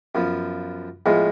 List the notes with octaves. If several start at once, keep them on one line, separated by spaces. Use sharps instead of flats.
F#2 F3 B3
A2 F3 G#3 B3